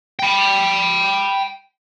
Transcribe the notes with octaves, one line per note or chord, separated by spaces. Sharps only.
G5 B5